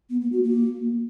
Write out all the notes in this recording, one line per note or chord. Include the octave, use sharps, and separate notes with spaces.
B3
A#3
F#4
A#3